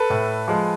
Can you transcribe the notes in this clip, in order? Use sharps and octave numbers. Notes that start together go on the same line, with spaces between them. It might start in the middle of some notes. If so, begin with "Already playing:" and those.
Already playing: A4 B4
A2
F3 G#3